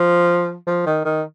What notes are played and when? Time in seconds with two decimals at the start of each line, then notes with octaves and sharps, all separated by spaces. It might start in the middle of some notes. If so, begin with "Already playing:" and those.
Already playing: F3
0.67 F3
0.86 D#3
1.05 D#3